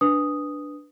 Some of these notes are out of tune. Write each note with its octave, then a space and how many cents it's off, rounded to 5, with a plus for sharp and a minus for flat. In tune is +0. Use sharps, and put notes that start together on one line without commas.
D4 +0 B4 +0 D#6 +0